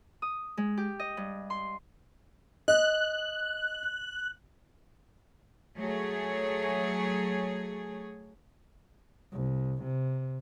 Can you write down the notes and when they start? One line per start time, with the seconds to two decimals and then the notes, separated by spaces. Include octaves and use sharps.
0.22 D#6
0.57 G#3
0.77 G4
0.99 D#5
1.17 G2
1.50 C6
2.68 D#5 F#6
5.77 F#3 A3 G#4 C#5
9.33 C2
9.84 C3